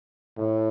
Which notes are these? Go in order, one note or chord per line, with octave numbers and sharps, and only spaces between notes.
A2